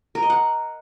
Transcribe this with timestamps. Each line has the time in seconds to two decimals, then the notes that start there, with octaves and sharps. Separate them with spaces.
0.15 A#4
0.22 D#5
0.30 F#5